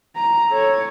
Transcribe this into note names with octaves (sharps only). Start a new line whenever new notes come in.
A#5
A4 C#5